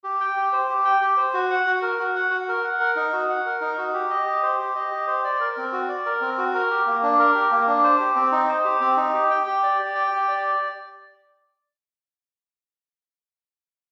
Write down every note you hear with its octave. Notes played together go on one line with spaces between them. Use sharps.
G4
G5
G4
C5
G4
G5
G4
C5
F#4
F#5
F#4
A#4
F#4
F#5
F#4
A#4
F#5
A#4
D#4
F#4
F#5
A#4
D#4
F#4
G4
D#5
G4
C5
G4
D#5
G4
C5
D5
A#4
C4
F#4
D5
A#4
C4
F#4
A#4
G4
A#3
D4
A#4
G4
A#3
D4
C5
G4
C4
D#4
C5
G4
C4
D#4
G4
G5
G4
D5
G4
G5
G4
D5